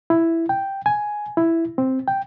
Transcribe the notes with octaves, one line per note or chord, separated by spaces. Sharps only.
E4
G5
G#5
E4
C4
G5